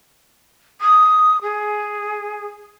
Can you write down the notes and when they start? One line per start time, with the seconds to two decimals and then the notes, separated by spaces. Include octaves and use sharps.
0.81 D#6
1.42 G#4